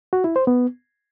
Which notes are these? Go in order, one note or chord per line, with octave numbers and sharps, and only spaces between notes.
F#4
E4
C5
B3